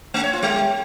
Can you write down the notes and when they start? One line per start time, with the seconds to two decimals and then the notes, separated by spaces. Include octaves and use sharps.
0.14 A3
0.24 C#5
0.33 F4
0.43 G3